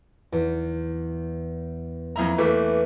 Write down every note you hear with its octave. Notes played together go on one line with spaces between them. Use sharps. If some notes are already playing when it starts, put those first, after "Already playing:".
E2
F2 A#3 E4 A#5
E3 A3 A#3 B4